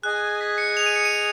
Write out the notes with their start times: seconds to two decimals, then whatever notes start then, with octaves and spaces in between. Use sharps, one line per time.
0.03 G#4 D#5 G#5 F#6
0.40 B6
0.58 C#7
0.77 F7
0.86 D#7
0.96 C#7
1.05 D#7